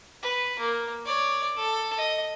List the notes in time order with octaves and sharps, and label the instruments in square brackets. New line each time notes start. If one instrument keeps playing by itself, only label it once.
[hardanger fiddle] B4
A#3
C#5 D5
A4
D#5